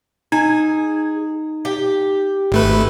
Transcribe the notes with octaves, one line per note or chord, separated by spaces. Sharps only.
D#4 G#4
G4
G#1 A3 B4